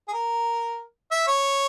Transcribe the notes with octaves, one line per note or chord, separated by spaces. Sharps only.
G#4
A#4
E5
C#5